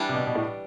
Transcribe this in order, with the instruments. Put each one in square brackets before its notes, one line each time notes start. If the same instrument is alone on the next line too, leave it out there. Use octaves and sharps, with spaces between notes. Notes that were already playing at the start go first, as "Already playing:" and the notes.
Already playing: [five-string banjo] E3 G3 D4
[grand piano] C3
B2
B2
A2